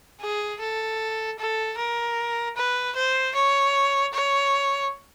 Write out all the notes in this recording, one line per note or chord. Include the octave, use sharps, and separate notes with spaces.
G#4
A4
A4
A#4
B4
C5
C#5
C#5